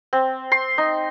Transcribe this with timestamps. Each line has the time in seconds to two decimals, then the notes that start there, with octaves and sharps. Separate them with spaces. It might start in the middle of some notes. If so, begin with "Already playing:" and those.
0.13 C4
0.52 C6
0.78 D#4